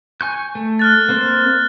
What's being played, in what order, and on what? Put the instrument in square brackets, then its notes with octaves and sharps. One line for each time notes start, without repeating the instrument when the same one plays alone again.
[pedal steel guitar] G#5 C#6 G6
A3
[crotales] F6 F#6 A6
[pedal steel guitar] A#3 C4